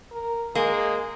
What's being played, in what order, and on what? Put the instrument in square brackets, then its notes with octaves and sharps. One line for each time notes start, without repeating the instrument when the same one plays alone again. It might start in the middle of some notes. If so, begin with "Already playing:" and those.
[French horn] A#4
[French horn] G#3 [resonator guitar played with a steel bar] A#3